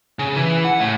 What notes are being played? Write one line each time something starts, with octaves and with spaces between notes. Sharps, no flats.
C#3
E3
F#5
A2